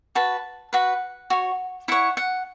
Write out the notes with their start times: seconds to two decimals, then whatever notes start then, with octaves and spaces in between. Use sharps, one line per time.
0.15 F#4 B4 A5
0.73 F#4 B4 F#5
1.30 F#4 C#5
1.88 E4 C#5 F#5
2.17 F#5